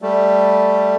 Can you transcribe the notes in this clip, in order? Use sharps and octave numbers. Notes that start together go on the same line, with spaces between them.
G3 A3